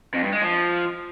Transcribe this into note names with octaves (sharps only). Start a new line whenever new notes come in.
F2
G2
G#3
F3